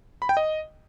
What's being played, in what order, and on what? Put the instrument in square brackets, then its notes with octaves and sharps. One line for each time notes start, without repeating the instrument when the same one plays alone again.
[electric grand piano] B5
G5
D#5